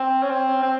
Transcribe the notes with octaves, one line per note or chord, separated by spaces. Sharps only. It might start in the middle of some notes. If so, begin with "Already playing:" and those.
Already playing: C4
C#4
C4
C4